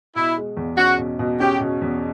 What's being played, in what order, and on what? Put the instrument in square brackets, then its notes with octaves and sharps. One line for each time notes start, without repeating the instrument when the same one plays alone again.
[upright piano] B2 [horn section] E4
[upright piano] G#3
E2
[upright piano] C#4 [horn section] F#4
[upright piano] B2
B2
[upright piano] C#4 [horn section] G4
[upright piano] B2
E2